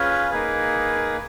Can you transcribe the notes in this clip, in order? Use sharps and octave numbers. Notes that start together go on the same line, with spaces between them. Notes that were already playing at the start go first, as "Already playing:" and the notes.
Already playing: C#4 F4 G#4 B4
A#3 D#4 G#4 B4